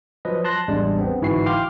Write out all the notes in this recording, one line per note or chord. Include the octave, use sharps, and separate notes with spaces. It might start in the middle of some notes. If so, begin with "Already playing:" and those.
F3 F#3 B4 D#5
A5 C6 F#6 A#6
A1 E2 G3 G#3 D4
B3 C4
G1 G#2 E3 E4 F#4 C7
F5 G5 C6 D6 F6